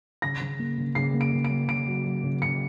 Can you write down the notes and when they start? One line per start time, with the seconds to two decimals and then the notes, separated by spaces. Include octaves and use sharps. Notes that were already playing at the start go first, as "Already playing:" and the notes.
0.22 C#3 A#6
0.41 C#3
0.59 A#3
0.78 C#3
0.95 C#3 C7
1.14 A#3
1.21 D7
1.32 C#3
1.45 D7
1.51 A#3
1.68 C#3 D7
1.87 F#3
2.05 F#3
2.23 C#3
2.42 C#3 C#7